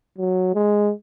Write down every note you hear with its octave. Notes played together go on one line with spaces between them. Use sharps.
F#3
G#3